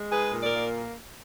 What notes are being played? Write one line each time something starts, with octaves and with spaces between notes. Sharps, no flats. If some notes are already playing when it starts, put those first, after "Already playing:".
Already playing: G#3
D#4 G#4 B4
A#2
A#4 D5
A#3